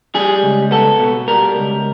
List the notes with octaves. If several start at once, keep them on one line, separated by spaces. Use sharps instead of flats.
G3 G#4
C#2
B3 A4
B2
G3 A#4
C#2